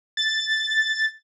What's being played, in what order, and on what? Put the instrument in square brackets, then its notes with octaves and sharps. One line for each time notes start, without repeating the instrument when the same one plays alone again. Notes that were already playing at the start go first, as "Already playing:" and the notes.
[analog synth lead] A6